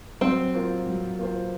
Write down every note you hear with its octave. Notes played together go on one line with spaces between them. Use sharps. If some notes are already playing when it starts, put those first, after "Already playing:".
F#3 C4
A#3 F4 C5
F#3
A#3 F4 C5